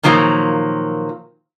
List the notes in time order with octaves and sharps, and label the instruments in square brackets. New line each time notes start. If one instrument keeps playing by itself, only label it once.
[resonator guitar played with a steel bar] A#2 D#3 F3 F#3 A#3